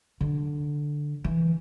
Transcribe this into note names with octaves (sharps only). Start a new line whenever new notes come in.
D3
E3